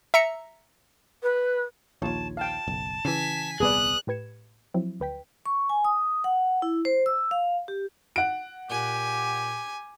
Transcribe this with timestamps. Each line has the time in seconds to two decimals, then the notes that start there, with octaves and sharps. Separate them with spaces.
0.14 E5 A#5 C#7
1.23 B4
2.02 A#1 D#2 F4 C#5 A5
2.37 F5 G5 A5
2.67 F#1 B1
3.05 C#3 E3 G#5 B6
3.60 D#1 C2 B3 G#4 B4 D5 D#6 F#6
4.07 A2 G4 B4 G#6 C#7 E7
4.74 F3 F#3 C4 E4
5.00 D2 B4 G5 B6
5.46 C#6
5.69 G#5
5.85 D#6
6.24 F#5
6.62 E4
6.85 C5
7.06 E6
7.31 F5
7.68 G4
8.16 F#5 D7
8.70 A#2 G4 G#5